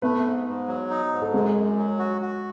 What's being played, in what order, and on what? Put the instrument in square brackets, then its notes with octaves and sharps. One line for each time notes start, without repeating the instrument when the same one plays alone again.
[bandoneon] A3 [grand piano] B3 B4
[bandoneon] G#2
G#2
F#3
D#4
G#2
[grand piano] A4
[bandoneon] F#2 [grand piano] G#3 G#4
[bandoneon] F#2
F#3
F#4
F#4